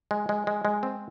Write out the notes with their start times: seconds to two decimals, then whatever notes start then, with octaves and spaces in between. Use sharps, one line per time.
0.11 G#3
0.29 G#3
0.47 G#3
0.65 G#3
0.83 C4